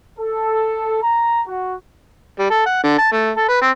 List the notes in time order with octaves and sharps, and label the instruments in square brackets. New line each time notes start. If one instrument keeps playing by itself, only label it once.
[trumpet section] A4
A#5
F#4
[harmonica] G3
A4
F#5
D3
A5
A3
A4
B4
C4